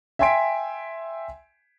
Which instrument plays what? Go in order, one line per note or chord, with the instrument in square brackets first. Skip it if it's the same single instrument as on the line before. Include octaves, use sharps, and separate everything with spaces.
[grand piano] E5 G5 G#5 C6 B6 D7